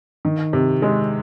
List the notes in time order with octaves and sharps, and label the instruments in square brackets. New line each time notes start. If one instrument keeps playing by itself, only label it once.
[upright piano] D#3
C3
G#3